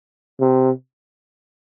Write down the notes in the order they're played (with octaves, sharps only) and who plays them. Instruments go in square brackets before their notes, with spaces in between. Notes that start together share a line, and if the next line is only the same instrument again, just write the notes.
[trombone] C3